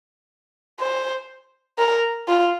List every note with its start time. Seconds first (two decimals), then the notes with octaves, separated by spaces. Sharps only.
0.80 C5
1.78 A#4
2.28 F4